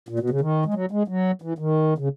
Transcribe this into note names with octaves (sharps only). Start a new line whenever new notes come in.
A#2
B2
C#3
D#3
G#3
F#3
G#3
F#3
E3
D#3
C#3